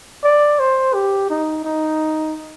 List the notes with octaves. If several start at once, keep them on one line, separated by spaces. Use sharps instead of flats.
D5
C5
G4
D#4
D#4